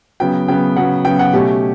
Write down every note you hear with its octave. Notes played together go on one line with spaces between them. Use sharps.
C#3 F#3 B3 G5
C#3 F#3 B3 G5
C#3 F#3 B3 F#5
C#3 F#3 B3 G5
F#5
B2 A3 C#4 G4